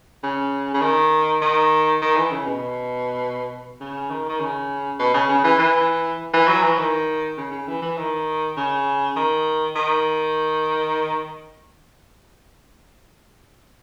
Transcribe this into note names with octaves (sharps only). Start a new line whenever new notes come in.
C#3
C#3
D#3
D#3
D#3
E3
C#3
B2
C#3
D#3
D#3
C#3
B2
C#3
C#3
E3
E3
E3
F#3
E3
D#3
C#3
C#3
E3
E3
D#3
C#3
D#3
D#3